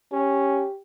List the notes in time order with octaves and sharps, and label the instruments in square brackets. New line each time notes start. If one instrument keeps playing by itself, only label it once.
[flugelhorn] C#4 [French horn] G4